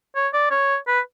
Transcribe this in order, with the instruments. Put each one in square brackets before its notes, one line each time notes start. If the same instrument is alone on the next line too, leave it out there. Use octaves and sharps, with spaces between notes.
[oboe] C#5
D5
C#5
B4